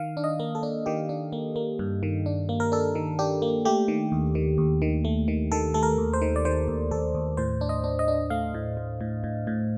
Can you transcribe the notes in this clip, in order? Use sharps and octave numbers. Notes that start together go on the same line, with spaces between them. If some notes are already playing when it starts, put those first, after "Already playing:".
Already playing: D#3 F5
D4
D#5
A#3
A4
D4
D#3 G4
D4
A#3
A#3
G2
D#3
D4
A#3
A#4
D4 A4
D#3
D4 G4
A#3
A3 G4
D#3
D#2
D#3
D#2
D#3
A3
D#3
D#3 A4
A3 A4
A#4
D#2
C5
D#3
D5
D#3 C5
D#2
D#2 A4
D#2
A2 C5
D4
D#5
D4
D#5
D4
A3 F5
A2
A2
A2
A2
A2